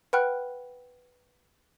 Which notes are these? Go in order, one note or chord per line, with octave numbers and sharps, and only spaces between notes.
B4 F#5 G5 B5 F6 F#6